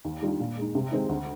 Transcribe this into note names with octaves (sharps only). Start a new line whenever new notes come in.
D#2
D#3 G3 D4 F4
A#2
G#3 D#4
C3
D#3 G#3 C4
D2